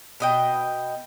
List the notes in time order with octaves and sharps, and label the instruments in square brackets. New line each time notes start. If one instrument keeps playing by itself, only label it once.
[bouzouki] B2 D#5 G5